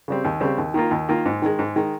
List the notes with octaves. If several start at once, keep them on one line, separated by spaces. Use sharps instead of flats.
C#3 G3 C4
D#2
C#3 G3 C4
D#2
D#3 A#3 F4
D#2
D#3 A#3 F4
G#2
D#3 G#3
G#2
D#3 G#3